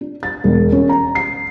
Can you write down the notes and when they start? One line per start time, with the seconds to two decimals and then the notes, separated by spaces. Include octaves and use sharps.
0.01 D4
0.23 A6
0.44 E1
0.72 C#4
0.89 A#5
1.15 C7